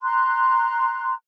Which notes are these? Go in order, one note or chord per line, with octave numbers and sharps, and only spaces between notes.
A#5 C6 F#6